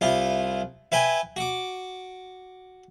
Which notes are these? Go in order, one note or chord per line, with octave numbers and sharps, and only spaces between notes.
C2 E4 F4
E4 B4 G5 G#5
F#4 D6